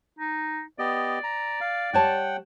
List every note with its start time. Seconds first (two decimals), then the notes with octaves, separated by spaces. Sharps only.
0.19 D#4
0.79 B3 G4 D5 D#5
1.24 A#5
1.61 F5
1.93 G3 C#5 F#5 G5 A5